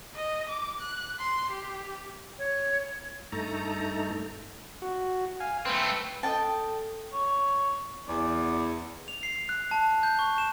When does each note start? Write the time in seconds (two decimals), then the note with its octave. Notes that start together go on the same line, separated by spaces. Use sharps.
0.14 D#5
0.49 D6
0.80 F#6
1.20 C6
1.51 G4
2.38 C#5
3.32 G2 A3 D#4 A4 A#5
4.82 F#4
5.40 F5 G#5
5.65 A3 C4 B4
6.23 A4 D#5 G5 A5
7.13 C#5
8.08 E2 D5
9.08 F7
9.23 C7
9.49 F#6
9.71 A5
10.03 G6
10.19 C#6
10.38 E7